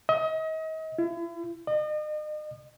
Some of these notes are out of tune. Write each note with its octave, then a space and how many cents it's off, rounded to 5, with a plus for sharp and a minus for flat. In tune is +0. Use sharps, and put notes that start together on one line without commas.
D#5 +35
E4 +40
D#5 -40